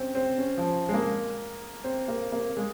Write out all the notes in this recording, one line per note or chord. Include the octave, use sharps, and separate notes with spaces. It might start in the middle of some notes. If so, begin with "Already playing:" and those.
Already playing: C4 C#4
C4
C#4
F3
G#3
A#3
C4
A#3
A#3
G#3